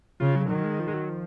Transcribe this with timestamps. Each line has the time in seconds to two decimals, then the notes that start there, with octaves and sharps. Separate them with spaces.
0.20 C#3 F4
0.36 F#3
0.50 D#3 F#3
0.64 G#3
0.80 F3
0.88 G#3
0.94 F#3
1.09 F3